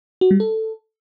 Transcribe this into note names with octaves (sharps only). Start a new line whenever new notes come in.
F#4
G3
A4